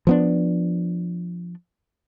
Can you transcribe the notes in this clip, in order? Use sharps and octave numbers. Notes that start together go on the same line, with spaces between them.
F3 B3 D4